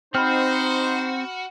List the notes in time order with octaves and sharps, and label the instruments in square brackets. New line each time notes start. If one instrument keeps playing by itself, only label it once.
[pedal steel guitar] C4 [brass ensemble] D#4 C5 [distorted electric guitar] F#4 [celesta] B5 F6